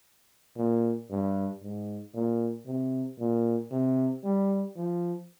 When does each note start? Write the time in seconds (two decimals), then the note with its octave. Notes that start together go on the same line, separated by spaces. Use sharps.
0.56 A#2
1.10 G2
1.62 G#2
2.14 A#2
2.66 C3
3.19 A#2
3.71 C3
4.24 G3
4.76 F3